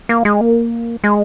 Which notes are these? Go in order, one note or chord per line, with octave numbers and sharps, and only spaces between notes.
A#3
G#3
A#3
G#3